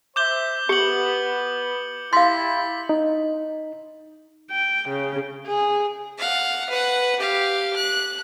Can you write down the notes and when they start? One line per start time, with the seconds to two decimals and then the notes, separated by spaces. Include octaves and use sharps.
0.16 C5 E5 D6 G6 G7
0.69 B3 G4 C#7 F#7
2.13 E4 G4 F5 C6 A6 B6
2.89 D#4
4.50 G5
4.89 C#3
5.47 G#4
6.18 F5 F#5
6.70 B4 F#5
7.19 G4 F5
7.76 F#6